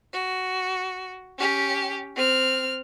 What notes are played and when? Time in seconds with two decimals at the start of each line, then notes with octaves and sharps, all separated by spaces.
0.13 F#4
1.38 C#4 G4
2.16 C4 F6